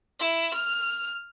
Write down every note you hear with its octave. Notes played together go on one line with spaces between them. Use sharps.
E4
F6